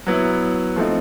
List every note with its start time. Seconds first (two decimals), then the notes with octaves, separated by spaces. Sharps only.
0.07 F#3 B3 E4
0.76 F3 A3 C4 D#4